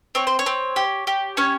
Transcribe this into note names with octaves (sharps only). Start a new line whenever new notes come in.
C4 C#5
C5
C#5
C4
G4
G4
C#4 C#5